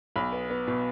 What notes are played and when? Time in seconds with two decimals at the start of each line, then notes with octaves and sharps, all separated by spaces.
0.16 B1 B5
0.32 B3
0.50 B3
0.67 B2